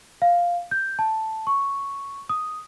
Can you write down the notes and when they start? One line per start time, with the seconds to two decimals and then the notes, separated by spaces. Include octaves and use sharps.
0.22 F5
0.71 G6
0.99 A5
1.47 C#6
2.29 D#6